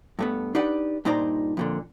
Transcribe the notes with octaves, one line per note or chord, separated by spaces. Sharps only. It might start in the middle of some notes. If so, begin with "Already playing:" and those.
G2 A3 B3
D4 D#4 G4 B4 D5 F#5
G2 A#2 D#4 C5 D5 A#5
F2 A#2 D3